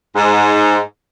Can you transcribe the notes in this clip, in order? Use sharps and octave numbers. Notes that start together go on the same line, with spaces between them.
G#2